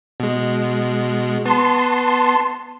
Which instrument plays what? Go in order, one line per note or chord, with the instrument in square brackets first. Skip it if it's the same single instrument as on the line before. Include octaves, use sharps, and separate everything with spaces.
[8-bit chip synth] B2 G#3
[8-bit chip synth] B3 [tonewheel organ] A5 C6